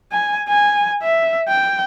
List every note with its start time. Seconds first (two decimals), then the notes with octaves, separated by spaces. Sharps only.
0.12 G#5
0.49 G#5
1.03 E5
1.49 G5